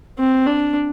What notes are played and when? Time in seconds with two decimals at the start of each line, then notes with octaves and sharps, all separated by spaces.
0.19 C4
0.46 D4